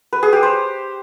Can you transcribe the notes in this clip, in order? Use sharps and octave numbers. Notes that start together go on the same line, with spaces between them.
B4
G#4
G4
C5